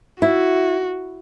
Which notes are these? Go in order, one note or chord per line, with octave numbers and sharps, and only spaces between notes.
E4 F#4